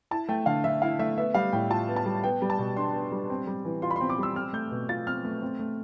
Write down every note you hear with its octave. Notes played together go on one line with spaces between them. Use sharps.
E4 A5
A3 G5
D3 F5
D3 E5
E4 F5
A3 E5
B3 E5
G3 F5
A2 G5
F4 A5
B3
A5
G3
B3 G5
G3
A5
B2
D4 C6
B3
G3
C4
G3
E3
F4 C6
B5
C6
C4
D6
G3 E6
C4 F6
A3 G6
B2
F4 A6
C4 F6
A3
C4
A3